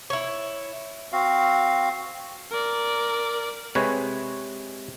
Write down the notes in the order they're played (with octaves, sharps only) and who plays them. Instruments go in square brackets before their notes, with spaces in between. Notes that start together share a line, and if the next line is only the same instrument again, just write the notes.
[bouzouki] E4 C#5
[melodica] C4 F#4 F5
[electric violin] A#4 D5
[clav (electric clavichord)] C3 G#3 B4 C#5 G#5